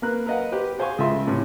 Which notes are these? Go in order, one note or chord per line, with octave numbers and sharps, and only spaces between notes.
A#3 A#4 B4 F#6
A#4 B4 D#5 F5 F#5
G4 B4 C5
F#4 G#4 C5 F5 G#5 C#6
C#2 F4 A4 E5 C6
A2 C3 C#4 E4